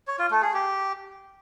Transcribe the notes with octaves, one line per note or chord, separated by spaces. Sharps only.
C#5
F4
A3
G#4
G4